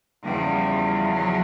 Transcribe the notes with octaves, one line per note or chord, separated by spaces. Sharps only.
E2 C#3 F3 G3
F#3